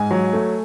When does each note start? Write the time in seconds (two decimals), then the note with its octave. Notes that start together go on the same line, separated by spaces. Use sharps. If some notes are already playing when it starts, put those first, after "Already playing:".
Already playing: G#2 G#5
0.11 F#3
0.33 A3